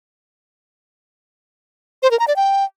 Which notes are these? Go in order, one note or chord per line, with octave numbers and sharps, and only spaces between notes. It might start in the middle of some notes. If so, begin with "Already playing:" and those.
C5
A#4
A#5
D5
G5